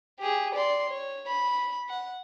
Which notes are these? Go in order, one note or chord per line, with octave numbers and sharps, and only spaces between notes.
G4 G#4
D5 C6
C#5
B5
F#5